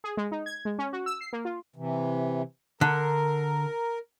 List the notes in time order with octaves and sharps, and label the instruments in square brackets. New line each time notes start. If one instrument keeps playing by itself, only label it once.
[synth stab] G#4
G#3
D#4
G#6
G#3
C#4
F#4
E6
C7
A#3
F4
[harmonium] C3 E3
[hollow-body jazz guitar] D3 [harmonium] A#4